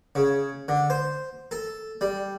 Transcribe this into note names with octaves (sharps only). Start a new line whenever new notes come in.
C#3
D3
C5
A4
G3